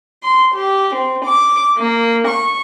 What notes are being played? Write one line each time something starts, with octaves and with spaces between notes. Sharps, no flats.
C6
G4
C4
D6
A#3
C#6